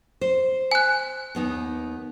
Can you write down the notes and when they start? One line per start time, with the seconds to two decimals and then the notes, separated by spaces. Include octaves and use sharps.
0.21 C5
0.71 G#5 F#6
1.35 D#2 B3 D#4